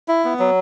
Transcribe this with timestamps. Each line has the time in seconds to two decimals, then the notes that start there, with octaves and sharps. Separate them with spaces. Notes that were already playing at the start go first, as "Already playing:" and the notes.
0.08 E4
0.25 B3
0.39 F#3